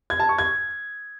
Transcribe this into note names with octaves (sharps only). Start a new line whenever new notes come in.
G#6
A5
C#6
G#6